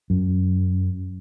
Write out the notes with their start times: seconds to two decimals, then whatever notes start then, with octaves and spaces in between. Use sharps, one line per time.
0.10 F#2